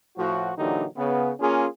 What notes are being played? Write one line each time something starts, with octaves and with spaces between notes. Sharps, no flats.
A2 F3 F#4
A#2 D3 E3 F#3 D#4 G4
C#3 B3
A#3 C#4 F4 G#4